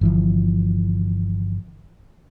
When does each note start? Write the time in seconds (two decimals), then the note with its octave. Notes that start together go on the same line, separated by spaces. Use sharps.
0.01 G1 E3 F3